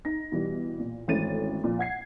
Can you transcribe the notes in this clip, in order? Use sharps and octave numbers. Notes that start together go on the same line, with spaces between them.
D#4 A#6
B2 E3 G3
A#2
G#1 E3 A3 C#4 A6 D#7
A#2 F3
F#5 G#6 C7